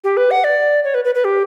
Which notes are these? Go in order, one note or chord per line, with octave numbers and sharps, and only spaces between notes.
G4
B4
F#5
D5
C#5
B4
B4
B4
G4